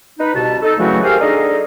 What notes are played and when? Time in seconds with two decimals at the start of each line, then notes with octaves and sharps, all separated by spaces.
0.19 D#4 B4
0.34 C2 B2 A5
0.63 D#4 A4
0.78 C#3 E3 F#3 A3 C4 F#4
1.04 G4 G#4 A#4 C5 F5
1.20 D4 D#4 G#4 A4 D#5